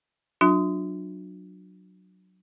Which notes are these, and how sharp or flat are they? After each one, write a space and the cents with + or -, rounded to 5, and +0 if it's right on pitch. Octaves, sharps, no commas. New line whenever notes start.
F#3 +0 D4 +15 F4 +40